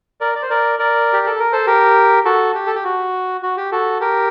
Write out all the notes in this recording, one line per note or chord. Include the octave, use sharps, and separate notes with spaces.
A#4 D5
D5
C5
A#4 D5
A#4 D5
G4
A4
A#4
A4 C5
G4 A#4
F#4 A4
G4
A4
G4
F#4
F#4
G4
F#4 A4
G4 A#4